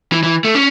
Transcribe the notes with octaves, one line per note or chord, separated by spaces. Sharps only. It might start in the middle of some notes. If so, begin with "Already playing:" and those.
E3
E3
A3
C#4